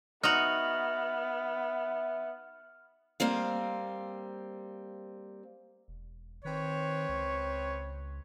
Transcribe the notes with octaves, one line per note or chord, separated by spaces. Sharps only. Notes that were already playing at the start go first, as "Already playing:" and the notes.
B3 D#4 F#4 E5 F6 F7 F#7
G3 A#3 C4 F5
E1
D#3 C4 B4 C#5
C#2